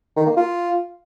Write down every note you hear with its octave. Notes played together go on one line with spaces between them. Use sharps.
D#3
A#3
F4